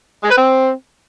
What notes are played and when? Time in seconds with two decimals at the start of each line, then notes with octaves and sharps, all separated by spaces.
0.24 G#3
0.30 B4
0.37 C4